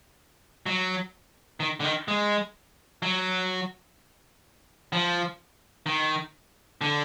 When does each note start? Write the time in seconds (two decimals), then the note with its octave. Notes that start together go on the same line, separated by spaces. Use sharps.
0.66 F#3
1.60 D#3
1.80 D3
1.84 D#3
2.08 G#3
3.02 F#3
4.93 F3
5.86 D#3
6.81 D3